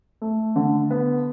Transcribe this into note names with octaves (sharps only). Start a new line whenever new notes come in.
A3
D3
B3